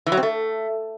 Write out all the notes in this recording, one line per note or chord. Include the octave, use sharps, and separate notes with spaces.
E3
F#3
C4
A3